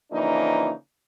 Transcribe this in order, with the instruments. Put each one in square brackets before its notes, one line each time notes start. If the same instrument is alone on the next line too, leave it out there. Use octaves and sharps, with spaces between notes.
[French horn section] C#3 E3 F3 A#3 D4 D#4